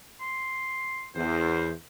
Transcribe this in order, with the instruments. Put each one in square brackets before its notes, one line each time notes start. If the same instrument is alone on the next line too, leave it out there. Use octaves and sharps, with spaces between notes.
[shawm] C6
[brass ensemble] E2 [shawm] C5